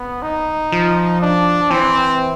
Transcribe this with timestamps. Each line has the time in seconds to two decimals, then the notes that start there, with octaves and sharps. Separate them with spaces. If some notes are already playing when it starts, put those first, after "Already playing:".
Already playing: B3
0.22 D#4
0.72 F3
1.22 D4
1.70 E3 C4